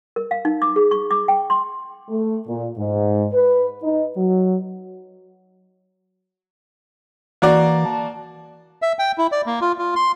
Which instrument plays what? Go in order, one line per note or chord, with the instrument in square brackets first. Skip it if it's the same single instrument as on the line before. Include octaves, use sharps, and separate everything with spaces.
[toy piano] A#4
F5
D#4
D6
G#4
C#6
D6
G5
C6
[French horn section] A3
A#2
G#2
B4
D#4
F#3
[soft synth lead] E3 [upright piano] A#3 F#4 D5
[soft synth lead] A5
[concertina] E5
G5
E4
D5
A#3
F4
F4
C6